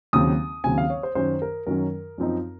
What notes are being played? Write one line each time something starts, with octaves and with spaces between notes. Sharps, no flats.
D#2 C#3 F#3 C4 D#6
D#2 C#3 F#3 C4 G#5
F5
C#5
C5
F#2 D#3 F#3 C#4 C5
A#4
F#2 D#3 F#3 C#4 A#4
F#2 F3 C4 D#4